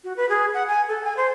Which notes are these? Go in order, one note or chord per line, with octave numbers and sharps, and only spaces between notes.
F#4
B4
G#4
F#5
G#5
A4
G#5
C5